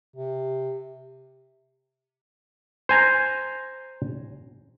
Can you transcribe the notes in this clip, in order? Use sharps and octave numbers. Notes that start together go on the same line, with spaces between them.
C3
C5 G#5 A#5